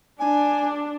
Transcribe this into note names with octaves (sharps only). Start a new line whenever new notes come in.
D4 G#5